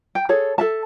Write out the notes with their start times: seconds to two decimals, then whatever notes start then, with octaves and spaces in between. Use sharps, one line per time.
0.15 G5
0.29 G#4 A4 C#5
0.58 A4 E5 A5